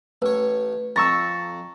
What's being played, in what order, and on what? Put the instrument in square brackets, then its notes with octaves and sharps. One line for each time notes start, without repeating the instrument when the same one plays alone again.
[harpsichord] A1 C#5 [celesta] B4
[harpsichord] F2 [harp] A#5 C#6 E6 [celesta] A6